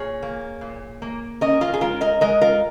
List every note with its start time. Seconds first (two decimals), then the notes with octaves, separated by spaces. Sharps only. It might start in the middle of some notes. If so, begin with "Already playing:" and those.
Already playing: A#2 G#4 C#5
0.22 A#3
0.61 A#2
1.02 A#3
1.41 C#4 A#4 D#5
1.61 F4 A#4
1.74 G#4
1.81 G#3 F4 A#4
2.01 A#4 D#5
2.21 G#3 A#4 D#5
2.41 F4 A#4